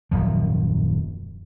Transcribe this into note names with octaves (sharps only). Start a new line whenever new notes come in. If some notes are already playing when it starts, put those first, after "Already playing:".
D#1 F#2 F3